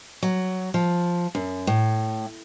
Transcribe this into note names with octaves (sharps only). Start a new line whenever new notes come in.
F#3
F3
F#2
A2